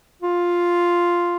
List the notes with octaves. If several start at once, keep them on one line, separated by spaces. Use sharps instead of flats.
F4